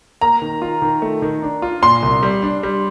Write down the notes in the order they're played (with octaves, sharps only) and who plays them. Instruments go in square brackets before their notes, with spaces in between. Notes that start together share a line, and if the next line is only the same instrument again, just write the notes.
[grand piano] A#3 [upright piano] A#5
[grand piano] D#3
F4
D#3
A3
D#3
D4
F4
[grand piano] A#2 [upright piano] C6
[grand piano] C2
G3
D4
G3